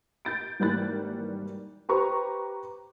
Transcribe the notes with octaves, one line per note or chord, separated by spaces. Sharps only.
G6 A6 D7
G#1 E3 G3 A#3 F#6 A6
G4 B4 C5 A#5 C#6